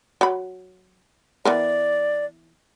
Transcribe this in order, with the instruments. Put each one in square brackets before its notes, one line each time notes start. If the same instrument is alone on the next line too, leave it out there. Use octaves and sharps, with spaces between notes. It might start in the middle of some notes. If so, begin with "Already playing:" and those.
[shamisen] F#3 B5
[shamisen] E3 B3 A#4 [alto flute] D5